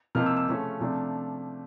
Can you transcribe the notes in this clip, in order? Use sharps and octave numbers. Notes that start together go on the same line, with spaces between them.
C3 F3 A#3 D#4 F6
E6
E6
C#3 F3 A3 C#4
C3 F3 A3 D4